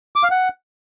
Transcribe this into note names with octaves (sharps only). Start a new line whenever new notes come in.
D6
F5
F#5